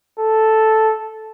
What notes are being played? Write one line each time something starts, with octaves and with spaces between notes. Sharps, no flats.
A4